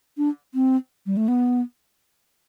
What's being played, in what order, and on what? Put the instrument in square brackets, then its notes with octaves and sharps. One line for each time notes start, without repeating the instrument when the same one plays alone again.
[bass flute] D4
C4
G3
A3
B3